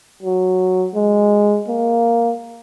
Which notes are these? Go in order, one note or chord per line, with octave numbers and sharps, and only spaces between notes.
F#3
G#3
A#3